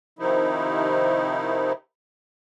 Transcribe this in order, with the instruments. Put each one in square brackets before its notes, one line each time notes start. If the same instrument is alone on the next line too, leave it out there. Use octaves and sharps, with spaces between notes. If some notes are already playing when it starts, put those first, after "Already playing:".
[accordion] C3 D#3 F3 D#4 E4